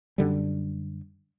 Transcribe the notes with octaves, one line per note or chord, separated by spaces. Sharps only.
F#2 D3 G3